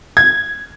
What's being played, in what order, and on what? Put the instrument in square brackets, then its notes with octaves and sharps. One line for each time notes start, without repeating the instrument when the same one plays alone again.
[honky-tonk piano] G#6